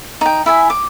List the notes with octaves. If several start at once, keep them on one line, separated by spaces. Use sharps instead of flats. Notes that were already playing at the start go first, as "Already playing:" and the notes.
D#4 G5
E4 E5 G#5
D6